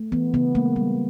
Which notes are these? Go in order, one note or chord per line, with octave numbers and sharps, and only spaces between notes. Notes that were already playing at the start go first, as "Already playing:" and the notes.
Already playing: A3
E3 B3
C#3 B3
G#3 A#3
G3